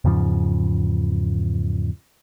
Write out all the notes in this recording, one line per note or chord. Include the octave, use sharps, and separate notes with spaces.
E2 G#2 C#3 F3